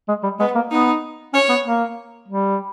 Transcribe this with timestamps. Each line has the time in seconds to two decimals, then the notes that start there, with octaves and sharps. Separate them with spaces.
0.08 G#3
0.23 G3
0.40 G#3 B3
0.55 A#3
0.71 B3 D#4
1.34 C#4 C#5
1.49 B3
1.65 A#3
2.28 G3